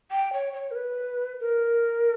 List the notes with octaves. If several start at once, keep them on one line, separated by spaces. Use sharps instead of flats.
G5
C#5
C#5
A#4
B4
A#4